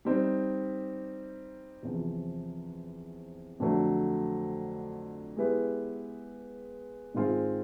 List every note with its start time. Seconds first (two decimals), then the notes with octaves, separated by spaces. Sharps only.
0.05 G3 C4 D#4
1.83 E2 C3 F3
3.60 F2 D3 F#3 A3
5.37 G#3 B3 E4 G4 B4
7.14 G#2 D#3 G#3 C4 F4